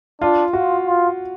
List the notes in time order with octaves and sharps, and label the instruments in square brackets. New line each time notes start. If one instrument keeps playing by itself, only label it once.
[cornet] D4 [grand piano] F4
[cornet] F4 [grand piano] F#4
[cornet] F4